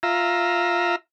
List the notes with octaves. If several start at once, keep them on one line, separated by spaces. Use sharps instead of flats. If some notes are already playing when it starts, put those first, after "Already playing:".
F4 E5 A#5